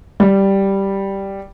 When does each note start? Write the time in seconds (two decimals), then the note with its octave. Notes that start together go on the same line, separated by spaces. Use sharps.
0.20 G3